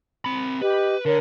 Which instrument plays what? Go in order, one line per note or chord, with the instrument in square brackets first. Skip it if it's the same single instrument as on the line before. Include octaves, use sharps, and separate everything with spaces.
[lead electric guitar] C4 B5
[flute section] G4 D#5 [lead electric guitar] B4
[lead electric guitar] D3 [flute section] A#4 C#5